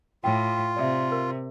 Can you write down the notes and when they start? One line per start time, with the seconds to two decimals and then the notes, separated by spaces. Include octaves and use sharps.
0.24 A2 F4 G5
0.77 C3 D5 E5
1.12 A#4